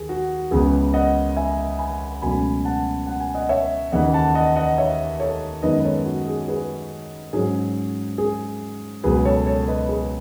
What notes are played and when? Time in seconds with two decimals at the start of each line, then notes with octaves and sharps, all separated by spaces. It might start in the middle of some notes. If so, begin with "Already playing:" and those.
Already playing: D#2 G#4
0.09 F#4
0.51 C#2 C#3 E3 B3 G#4
0.94 D#5 F#5
1.36 E5 G#5
1.79 G#5 B5
2.22 C#2 B2 F#3 A3 C#4 G#5 B5
2.65 F#5 A5
3.07 F#5
3.20 G#5
3.35 D#5 F#5
3.49 C#5 E5
3.92 D#2 C#3 E3 D#5 F#5
4.14 F#5 A5
4.35 D#5 F#5
4.56 D#5 F#5
4.78 C#5 E5
5.20 A4 C#5
5.62 F#2 D#3 G#3 B3 B4 D#5
5.79 B4
5.84 A4 C#5
6.06 F#4
6.27 G#4
6.48 G#4 B4
7.33 G#2 F#3 C#4 G#4
8.18 G#4
9.03 C#2 B2 F#3 G#4 B4
9.25 A4 C#5
9.46 A4 C#5
9.68 B4 D#5
9.88 G#4 B4